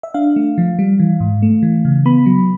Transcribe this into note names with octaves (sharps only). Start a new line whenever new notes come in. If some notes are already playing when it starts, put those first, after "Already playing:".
E5
D4 F5
A3
F3
G3
E3
G#2
A3
E3
C#3
B3 B5
F#3